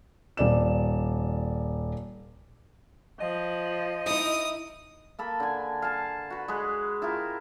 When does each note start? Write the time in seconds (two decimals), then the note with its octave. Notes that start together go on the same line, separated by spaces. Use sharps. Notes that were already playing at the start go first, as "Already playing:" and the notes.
0.37 D#1 D5 E7
3.20 F3 D#5
4.06 D#4 E4 D#6
5.19 A#3 A4 B5
5.40 D3 G#5
5.82 F5 G#5 A5
6.30 F#4 B4
6.48 G#3 G#4 B4
7.02 E4 F4 G4 A#4